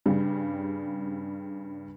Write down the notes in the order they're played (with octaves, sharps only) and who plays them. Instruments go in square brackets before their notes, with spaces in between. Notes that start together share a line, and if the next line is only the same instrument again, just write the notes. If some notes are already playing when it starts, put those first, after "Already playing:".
[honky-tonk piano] G2 C#3 G3